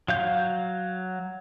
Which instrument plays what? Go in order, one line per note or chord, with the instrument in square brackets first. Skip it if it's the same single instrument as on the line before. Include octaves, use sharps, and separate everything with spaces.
[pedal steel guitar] F#3 F5 G6